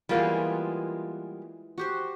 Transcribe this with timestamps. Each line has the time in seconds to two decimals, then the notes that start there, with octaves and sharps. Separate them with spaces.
0.09 E3 G3 G#3 A#3 B3 F4
1.78 F#4 G4 C5